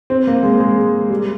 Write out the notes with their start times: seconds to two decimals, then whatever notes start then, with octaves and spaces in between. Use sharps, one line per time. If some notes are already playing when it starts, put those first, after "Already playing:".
0.10 C4
0.27 A#3
0.43 G#3
0.60 G#3
1.10 G3